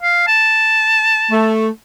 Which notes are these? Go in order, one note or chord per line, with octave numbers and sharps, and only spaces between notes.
F5
A5
A3